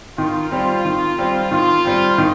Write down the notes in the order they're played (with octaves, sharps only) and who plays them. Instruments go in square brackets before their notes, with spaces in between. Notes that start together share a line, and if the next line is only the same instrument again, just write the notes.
[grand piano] D#3 [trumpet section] F4
[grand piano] G3 C4
D#3
G3 C4
[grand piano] D#3 [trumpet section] F4
[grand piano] G3 C4
D#3